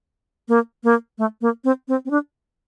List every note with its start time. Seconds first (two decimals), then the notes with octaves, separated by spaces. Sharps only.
0.48 A#3
0.84 A#3
1.18 A3
1.41 A#3
1.64 C4
1.88 C4
2.05 C4
2.11 D4